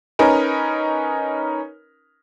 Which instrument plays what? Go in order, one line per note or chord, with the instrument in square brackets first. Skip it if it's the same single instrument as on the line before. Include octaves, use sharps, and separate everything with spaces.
[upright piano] C#4 D#4 A#4 B4